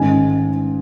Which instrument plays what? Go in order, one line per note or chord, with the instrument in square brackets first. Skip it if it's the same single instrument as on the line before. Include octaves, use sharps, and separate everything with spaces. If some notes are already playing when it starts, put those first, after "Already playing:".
Already playing: [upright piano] A1 G#2 D#3 G#3 G#5